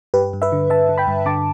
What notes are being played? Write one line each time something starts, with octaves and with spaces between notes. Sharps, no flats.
G2 G4 B4
G2
B4 E5
D3
D3 E5 A5
D3
G5 B5
G2
D3 A5 D6